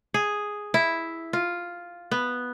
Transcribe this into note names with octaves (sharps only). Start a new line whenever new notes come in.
G#4
E4
F4
B3